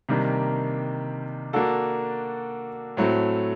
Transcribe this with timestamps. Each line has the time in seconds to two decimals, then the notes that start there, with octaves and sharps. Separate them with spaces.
0.09 C3 D#3 G3 A#3 D4
1.53 A#3 D4 F#4 A4
2.97 A2 F#3 A3 C4